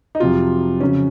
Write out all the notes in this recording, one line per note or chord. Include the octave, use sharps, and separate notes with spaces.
D#4
F2 C3 F#3 F4
F2 C#3 F#3 C#4